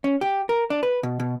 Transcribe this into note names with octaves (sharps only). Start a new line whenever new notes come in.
C#4
G4
A#4
D4
B4
B2
B2